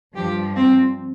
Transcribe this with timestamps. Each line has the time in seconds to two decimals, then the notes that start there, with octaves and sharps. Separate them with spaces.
0.16 G2 F3 G4
0.56 C4